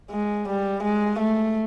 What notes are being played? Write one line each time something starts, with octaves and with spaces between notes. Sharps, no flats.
G#3
G3
G#3
A3